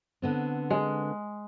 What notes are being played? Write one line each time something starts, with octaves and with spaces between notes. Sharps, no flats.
D3 B3 C4
G#3